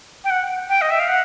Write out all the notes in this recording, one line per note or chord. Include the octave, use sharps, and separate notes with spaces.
G5
F#5
G5
D#5
E5
F5
F#5